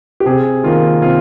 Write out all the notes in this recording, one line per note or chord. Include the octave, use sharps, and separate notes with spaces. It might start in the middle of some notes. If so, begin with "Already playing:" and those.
G4
C3 G#4
D#3 A#3 F4
C3 F4